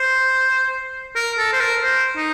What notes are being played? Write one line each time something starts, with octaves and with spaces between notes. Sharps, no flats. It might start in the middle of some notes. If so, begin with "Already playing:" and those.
Already playing: C5
A#4
A4
C5
A#4
C5
D#4